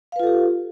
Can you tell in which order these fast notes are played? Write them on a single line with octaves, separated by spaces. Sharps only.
F5 B4 F4 A4 G4